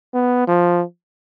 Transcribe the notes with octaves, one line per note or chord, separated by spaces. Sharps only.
B3
F3